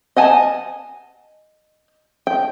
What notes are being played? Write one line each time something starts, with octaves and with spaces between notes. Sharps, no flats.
D#5 F#5 G#5 A5
G5